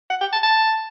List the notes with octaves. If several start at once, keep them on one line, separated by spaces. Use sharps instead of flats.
F#5
G5
A5
A5